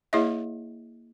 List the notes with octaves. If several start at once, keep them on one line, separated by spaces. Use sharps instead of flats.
A#3 E4 G#4 C#5 D#5 E5